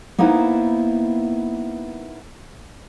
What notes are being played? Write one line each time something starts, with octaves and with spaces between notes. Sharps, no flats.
A#3 B3 D#4 E4 B4 C5